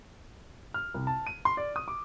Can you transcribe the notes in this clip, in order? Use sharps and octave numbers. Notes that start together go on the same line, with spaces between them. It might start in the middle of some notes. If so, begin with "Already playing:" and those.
F6
C2
A5
D#7
C6
D5
D#6
D6